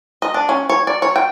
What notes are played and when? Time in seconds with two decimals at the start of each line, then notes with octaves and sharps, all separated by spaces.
0.22 D#5
0.34 D4
0.49 C#4
0.69 C#5
0.87 D5
1.02 C#5
1.16 G5